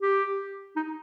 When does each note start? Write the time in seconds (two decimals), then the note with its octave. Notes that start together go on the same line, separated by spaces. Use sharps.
0.01 G4
0.76 D#4